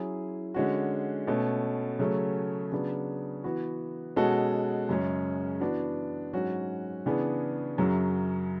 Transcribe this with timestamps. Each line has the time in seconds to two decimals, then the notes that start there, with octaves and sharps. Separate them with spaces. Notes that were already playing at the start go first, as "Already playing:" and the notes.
Already playing: F#3 C#4 E4 G#4
0.54 D3 G#3 C#4 F#4
1.27 B2 A3 C#4
1.99 C#3 F#3 A3 C#4
2.72 C#3 F#3 B3 D4
3.44 E3 B3 F#4
4.16 B2 G#3 C#4 F#4 A4
4.89 F#2 C#3 G#3 C#4
5.60 E3 B3 D4 F#4
6.33 G#2 F#3 C#4 F#4
7.06 C#3 E3 B3 D4 G#4
7.78 F#2 C#3 F#3